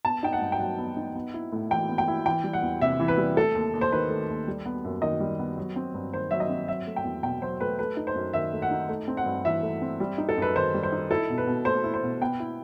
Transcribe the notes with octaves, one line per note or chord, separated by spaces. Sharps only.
B3 A5
D#4 G5
F#5
G2
G5
F#3 F#5
B3
D#4
B3
E4
A2
E3 G5
B3
G5
E4
E3 G5
G3
F#5
E2
C3 E5
E3
B4
G3
A3 A4
D#2
D#2
C5
D#3 B4
A3
D#2
G3
B3
F#2
D#3 D#5
G3
B3
F#3
C4
G2
D#3 C5
F#3 E5
D#5
C4
F#3 E5
A3
G5
E2
B2 G5
F#3 C5
A3 B4
A3 B4
D#4
C5
F#2
D#3 E5
A3
F#5
D#4
A3
C4
F#5
G2
E3 E5
A3
C4
G3
D#4
A4
F#2 B4
D#3 C5
G3
C5
D#4
E4 A4
B2
B4
B2
A3 C5
E4
C5
B2
B3 G5
E4